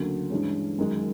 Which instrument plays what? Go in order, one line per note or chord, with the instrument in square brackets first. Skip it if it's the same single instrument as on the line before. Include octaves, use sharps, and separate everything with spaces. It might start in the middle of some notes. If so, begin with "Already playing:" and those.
Already playing: [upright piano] D2 C#3 F#3 A#3
G2 E3 G#3 C#4
F#2 D#3 G#3